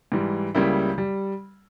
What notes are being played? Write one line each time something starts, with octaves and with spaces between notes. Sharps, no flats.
G#2 E3 G3
C#2 C#3 G3 A#3 E4
G3